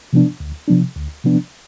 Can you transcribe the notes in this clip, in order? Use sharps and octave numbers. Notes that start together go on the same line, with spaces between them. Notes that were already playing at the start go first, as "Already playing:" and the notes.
C3 F3 B3 D4
D2
C3 F3 B3 D4
D2
C3 F3 B3 D4